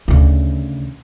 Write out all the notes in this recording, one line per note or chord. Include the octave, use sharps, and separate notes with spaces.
D2 C#3